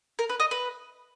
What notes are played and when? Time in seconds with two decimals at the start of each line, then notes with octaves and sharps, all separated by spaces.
0.19 A#4
0.29 B4
0.40 D#5
0.51 B4